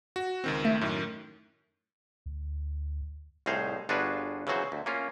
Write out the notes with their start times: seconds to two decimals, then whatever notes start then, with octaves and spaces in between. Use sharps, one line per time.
0.16 F#4
0.44 C#2 D#3 C4
0.65 A3
0.81 F#2 A2 D#3
2.26 D2
3.46 C2 A2 D#4 G#4 C5 F5
3.89 G1 D4 F4 F#4 G#4 B4
4.47 C#3 E3 F#3 F#4 C5
4.72 D2
4.86 A#3 C#4 F4